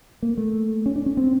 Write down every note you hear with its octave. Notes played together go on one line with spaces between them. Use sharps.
A#3
A3
C#4
D4
C#4
C4